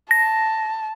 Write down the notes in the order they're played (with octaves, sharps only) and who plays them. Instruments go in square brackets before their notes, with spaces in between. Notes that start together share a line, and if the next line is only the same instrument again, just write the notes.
[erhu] A5 [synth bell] A#6